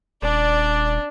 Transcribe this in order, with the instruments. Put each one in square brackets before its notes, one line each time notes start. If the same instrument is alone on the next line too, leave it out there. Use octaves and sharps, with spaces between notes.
[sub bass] D#1 [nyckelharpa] D4 [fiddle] D5